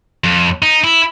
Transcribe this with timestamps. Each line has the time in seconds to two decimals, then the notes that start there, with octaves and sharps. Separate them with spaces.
0.24 F2
0.62 D#4
0.84 E4